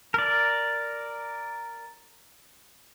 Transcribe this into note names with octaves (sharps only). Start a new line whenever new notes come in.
A#4 D5